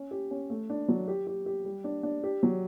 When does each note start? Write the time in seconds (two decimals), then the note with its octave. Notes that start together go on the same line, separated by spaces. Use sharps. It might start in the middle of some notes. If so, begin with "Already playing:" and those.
Already playing: C#4
0.11 G4
0.31 C#4
0.50 A3
0.70 D4
0.88 F#3
1.08 G4
1.27 G4
1.46 G4
1.65 G3
1.84 D4
2.03 D4
2.24 G4
2.43 F#3